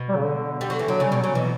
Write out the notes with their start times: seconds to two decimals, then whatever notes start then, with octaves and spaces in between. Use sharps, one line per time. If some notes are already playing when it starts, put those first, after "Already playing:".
Already playing: B2
0.09 G3
0.16 C#3
0.24 D3
0.61 G3
0.70 F#3
0.79 E3
0.87 D3 F#3
1.00 C#3 G3
1.12 B2
1.19 C#3 F#3
1.35 B2 E3